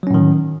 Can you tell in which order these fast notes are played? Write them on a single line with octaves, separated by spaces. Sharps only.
F#3 C#4 A2 D#3